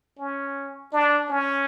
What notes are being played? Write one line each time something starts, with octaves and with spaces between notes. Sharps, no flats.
C#4
D4
C#4